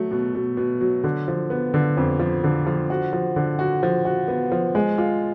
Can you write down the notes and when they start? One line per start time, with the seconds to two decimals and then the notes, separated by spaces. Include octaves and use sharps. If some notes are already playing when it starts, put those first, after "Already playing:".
Already playing: F#3 A3
0.11 B2
0.35 B2
0.57 B2
0.81 F#3
1.04 D3
1.28 F3
1.50 B3
1.74 D3
1.97 F2
2.19 F3
2.44 D3
2.66 F3
2.90 F#4
3.13 F3
3.36 D3
3.59 F#4
3.83 F3
4.05 F#4
4.28 B3
4.52 F3
4.75 G#3
4.98 F4